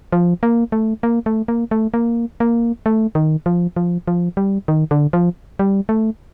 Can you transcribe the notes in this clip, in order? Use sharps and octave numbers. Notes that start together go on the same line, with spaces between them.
F3
A#3
A3
A#3
A3
A#3
A3
A#3
A#3
A3
D#3
F3
F3
F3
G3
D#3
D3
F3
G3
A3